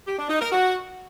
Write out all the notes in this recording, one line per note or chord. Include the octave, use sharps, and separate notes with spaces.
G4
D4
D#4
A#4
F#4